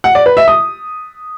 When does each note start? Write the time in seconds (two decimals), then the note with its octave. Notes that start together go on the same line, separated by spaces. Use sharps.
0.04 F#5
0.15 D5
0.26 B4
0.37 E5
0.48 D#6